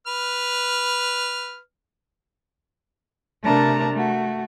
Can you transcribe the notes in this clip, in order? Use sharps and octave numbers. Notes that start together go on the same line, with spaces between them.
B4 F6
C3 A3 D4 A#4 A5 A#5
A3 F#4